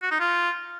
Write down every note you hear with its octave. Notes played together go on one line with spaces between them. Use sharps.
F#4
D#4
F4